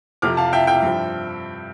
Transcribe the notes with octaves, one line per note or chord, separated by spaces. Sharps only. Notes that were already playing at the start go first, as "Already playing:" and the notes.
F2 C3 F3 D6 F6
F5 A5
E5 G5
E5 G5
G2 F3